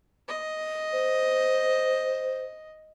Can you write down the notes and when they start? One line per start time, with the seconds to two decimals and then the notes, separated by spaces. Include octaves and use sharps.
0.28 D#5
0.93 C5